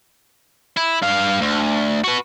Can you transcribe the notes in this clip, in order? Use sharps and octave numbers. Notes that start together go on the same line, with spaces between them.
E4
G2 F5
D2
F#4 B4